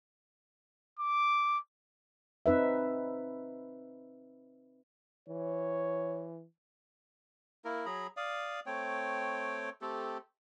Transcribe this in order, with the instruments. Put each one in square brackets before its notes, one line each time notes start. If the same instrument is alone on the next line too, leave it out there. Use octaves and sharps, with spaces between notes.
[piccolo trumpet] D6
[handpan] C4 D#4 B4 E5
[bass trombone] E3 [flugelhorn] C#5
[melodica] A#3 E4 A#4
F#3 G#4 A#5 B5
D5 F5 D#6
A3 C4 C#5 G5
A3 C4 G4 A4